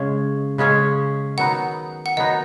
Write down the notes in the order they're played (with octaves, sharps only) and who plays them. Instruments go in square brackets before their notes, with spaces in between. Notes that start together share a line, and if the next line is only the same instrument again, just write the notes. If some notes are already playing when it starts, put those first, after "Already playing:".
Already playing: [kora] C#3 G#3 C#4 G#4 [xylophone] C#5
[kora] C#3 G#3 C#4 G#4
[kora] D#3 F#3 B3 D#4 [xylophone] F#5
[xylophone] F#5
[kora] D#3 F#3 B3 D#4 [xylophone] D#5